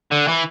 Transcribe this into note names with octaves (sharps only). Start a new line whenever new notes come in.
D3
E3